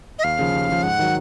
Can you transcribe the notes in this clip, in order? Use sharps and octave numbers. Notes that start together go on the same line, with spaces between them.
D#5
D#2 F5
C#3 F3
D#2
C#3 F3
G#2 F#5
D#3 F#3